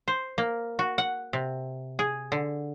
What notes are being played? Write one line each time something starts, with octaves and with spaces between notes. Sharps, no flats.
C5
A#3
F#4
F#5
C3
G#4
D3